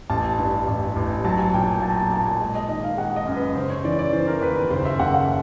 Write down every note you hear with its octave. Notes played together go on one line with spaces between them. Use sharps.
A1 A5
G2
A1
A1
F#3 A5
G#5
A#2 G5
G#5
F#3 A5
A#5
A5
A#2 A5
G#5
G#3
D#5
D#3 D#5
F5
G#3 F#5
D#5
F#2
B4
C#3 C5
C#5
E3 D5
D5
E3 C5
A#4
D#2 B4
B4
F#1 C5
E5
F#1 F#5
F#5